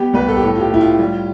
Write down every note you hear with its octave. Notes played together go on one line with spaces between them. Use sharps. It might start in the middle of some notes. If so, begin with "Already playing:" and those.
Already playing: G3 B3 G4
C2 B4
A4
G4
A2 A4
F4
G4
A2 E4
F4
G3